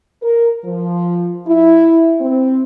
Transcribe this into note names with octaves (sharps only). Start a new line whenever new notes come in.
A#4
F3
E4
C4